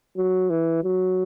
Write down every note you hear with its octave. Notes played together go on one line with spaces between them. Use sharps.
F#3
E3
F#3